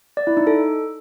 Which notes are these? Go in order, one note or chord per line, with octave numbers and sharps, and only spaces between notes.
D5
E4
D#4
A4